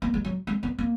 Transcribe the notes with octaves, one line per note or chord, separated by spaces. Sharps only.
A#3
G#3
F#3
G#3
B3
A#3